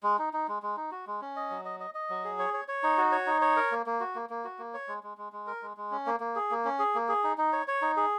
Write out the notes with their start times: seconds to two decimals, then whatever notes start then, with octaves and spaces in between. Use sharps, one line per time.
0.03 G#3
0.18 D#4
0.33 D#4
0.48 G#3
0.62 G#3
0.77 D#4
0.92 F#4
1.07 G#3
1.21 C#4
1.36 D#5
1.50 F#3
1.65 D#5
1.80 D#5
1.94 D#5
2.10 F#3
2.25 G#4
2.39 C#5
2.54 C#5
2.68 C#5
2.83 D#4
2.97 F#4
3.12 C#5
3.27 D#4
3.41 C#5
3.57 A#4
3.72 A#3
3.86 A#3
4.00 F#4
4.15 A#3
4.30 A#3
4.44 F#4
4.59 A#3
4.74 C#5
4.88 G#3
5.03 G#3
5.17 G#3
5.32 G#3
5.47 A#4
5.62 G#3
5.77 G#3
5.91 C#4
6.06 A#3
6.20 A#3
6.36 G#4
6.51 A#3
6.65 C#4
6.79 G#4
6.95 A#3
7.08 G#4
7.24 D#4
7.38 D#4
7.53 C#5
7.68 C#5
7.82 D#4
7.97 G#4